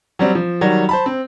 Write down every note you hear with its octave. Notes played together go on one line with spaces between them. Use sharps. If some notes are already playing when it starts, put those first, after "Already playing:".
F#3 G3 C4
F3
D#3 F#3 G3
C5 A5 B5
C4